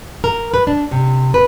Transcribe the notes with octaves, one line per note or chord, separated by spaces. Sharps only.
A#4
B4
D4
C3
B4